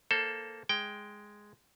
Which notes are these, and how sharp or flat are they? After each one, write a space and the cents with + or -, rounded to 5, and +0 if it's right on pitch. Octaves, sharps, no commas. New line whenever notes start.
A#3 -5 A4 +0 C5 +25
G#3 +0 G5 +0